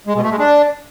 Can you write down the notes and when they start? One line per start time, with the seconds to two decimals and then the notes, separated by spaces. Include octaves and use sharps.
0.07 G#3
0.15 B2
0.23 A3
0.31 G#3
0.39 D4